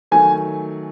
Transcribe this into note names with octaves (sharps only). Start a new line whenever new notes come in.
D#3 F#3 A3 G#5